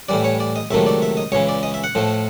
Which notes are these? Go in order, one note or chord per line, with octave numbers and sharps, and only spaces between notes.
A2 E3 G3 D5
C#5
D5
D#5
C#2 C3 D#3 F#3 A3 E5
D5
E5
D#5
C#2 C#3 E3 C#5
D5
D#5
E5
F#5
A2 F3 A3